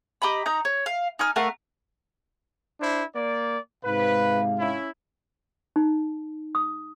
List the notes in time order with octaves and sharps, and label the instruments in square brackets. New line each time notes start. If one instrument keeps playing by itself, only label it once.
[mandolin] G4 D#5 A#5 B5
D#4 A#5 G6
C#5
F5
D#4 G#5 F6
A3 A#4 F5 F#5
[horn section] D4 E4 C5
A#3 D5
[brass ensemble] G#2 C3 F5 [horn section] B4
[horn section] C#4 E4
[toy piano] D#4
D#6